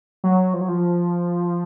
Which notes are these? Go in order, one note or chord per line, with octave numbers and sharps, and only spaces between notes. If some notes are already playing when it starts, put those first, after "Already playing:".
F#3
F3
F#3
F3